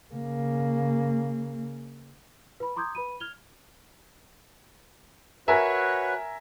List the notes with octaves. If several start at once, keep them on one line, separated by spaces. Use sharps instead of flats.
C#3 A#3
B4 B5
A#5 C6 D6 D#6 G6 G#6
B4 B5 D#7
F6 G#6 F7 G7
F#4 A#4 B4 C#5 E5 G#5